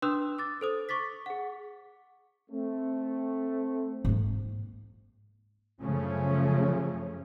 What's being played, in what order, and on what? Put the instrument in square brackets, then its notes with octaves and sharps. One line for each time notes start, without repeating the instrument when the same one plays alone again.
[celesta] D4 B4 C6 D#6 E6 F#6
D6 A6
A4 C5 D#6
C#6 D6 A6 B6
G#4 F#5
[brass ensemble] A3 C4
[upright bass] G#2 A#3
[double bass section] F#2 C#3 F3 A3 C#4